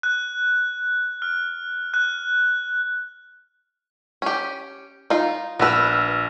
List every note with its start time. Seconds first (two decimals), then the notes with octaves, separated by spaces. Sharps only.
0.03 F#6
1.22 F6
1.94 F#6
4.22 C#4 G4
5.10 D#4 F4
5.59 A#1 B3 B4 E6 F6